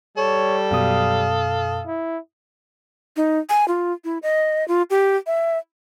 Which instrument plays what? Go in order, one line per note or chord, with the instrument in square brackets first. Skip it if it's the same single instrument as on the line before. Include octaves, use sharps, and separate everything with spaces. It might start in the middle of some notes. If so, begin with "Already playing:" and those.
[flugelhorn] G3 [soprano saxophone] A4 [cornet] C#5
[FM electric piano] F#2 B2 D#6 [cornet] F5
[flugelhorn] E4
[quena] D#4
G#5
F4
E4
D#5
F4
G4
E5